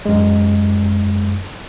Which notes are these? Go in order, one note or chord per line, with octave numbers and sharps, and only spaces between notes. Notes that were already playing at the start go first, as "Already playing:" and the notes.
F#2 G#3